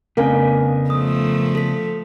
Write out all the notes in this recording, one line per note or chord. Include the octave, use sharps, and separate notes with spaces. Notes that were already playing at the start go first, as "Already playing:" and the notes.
F2 C#3 A3 B3 D4 A#4 F5 G#5
F3 A3 D#6
A4 B6